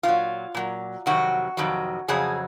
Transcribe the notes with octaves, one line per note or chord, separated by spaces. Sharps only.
A#2 F#3 F4
A#2 F#3
F2 C3 D#3 F#3 F#4
F2 C3 D#3 F#3
F2 C#3 F#3 G#4